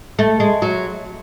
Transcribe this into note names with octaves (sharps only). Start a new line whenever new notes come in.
A3
G#3
F#3